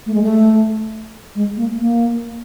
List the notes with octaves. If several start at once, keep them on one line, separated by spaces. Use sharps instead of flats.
A3
G#3
A3
G#3
A#3
A#3